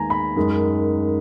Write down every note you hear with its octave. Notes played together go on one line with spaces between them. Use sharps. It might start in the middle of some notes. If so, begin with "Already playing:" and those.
Already playing: D#2 D#3 G#3 B3 G#5 A#5
B5
F#2 D#3 G#3